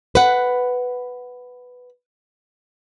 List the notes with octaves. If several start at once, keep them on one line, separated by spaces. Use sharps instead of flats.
B4 F#5